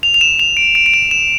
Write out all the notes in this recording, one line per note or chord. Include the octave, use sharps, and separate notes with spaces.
F7
F7
E7
F7
D7
D7
D7
E7
E7